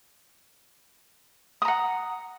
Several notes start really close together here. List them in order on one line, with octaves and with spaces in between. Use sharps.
D#6 A#5 F#5